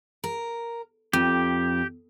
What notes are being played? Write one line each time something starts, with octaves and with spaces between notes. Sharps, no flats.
A#4
F2 G4